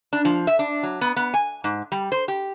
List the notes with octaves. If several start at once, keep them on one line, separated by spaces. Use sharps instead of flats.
D4
F3
E5
D4
F#3
B3
B3
G#5
G#2
G3
C5
G4